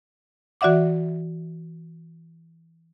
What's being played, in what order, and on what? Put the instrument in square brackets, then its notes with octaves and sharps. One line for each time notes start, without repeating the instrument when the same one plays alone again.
[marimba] E3 F#4 D5 E5 F#5 D6